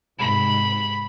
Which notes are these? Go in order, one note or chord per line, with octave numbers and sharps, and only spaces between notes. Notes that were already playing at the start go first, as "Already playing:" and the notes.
G#2 C3 B5